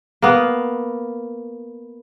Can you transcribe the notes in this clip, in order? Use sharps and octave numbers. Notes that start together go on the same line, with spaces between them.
A#3 B3